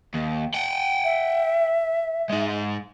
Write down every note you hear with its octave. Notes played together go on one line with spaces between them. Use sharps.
D#2
F#5 G5
E5
G#3 D#4